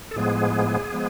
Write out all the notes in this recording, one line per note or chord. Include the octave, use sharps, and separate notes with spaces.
A4
A2 F3 G#3 B3 G#4
F3 G#3 B3